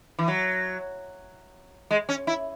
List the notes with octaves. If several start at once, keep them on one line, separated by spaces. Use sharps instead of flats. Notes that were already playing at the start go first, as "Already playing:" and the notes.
E3
F#3
G#3
C#4
E4